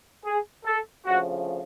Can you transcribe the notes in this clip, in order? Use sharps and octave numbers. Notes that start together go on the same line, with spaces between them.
G#4
A4
D2 C#3 F3 F#4